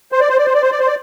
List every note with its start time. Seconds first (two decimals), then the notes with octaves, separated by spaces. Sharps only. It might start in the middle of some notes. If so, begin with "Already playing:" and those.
0.12 C5
0.20 D5
0.29 C5
0.38 D5
0.45 C5
0.54 D5
0.62 C5
0.71 D5
0.79 C5
0.87 D5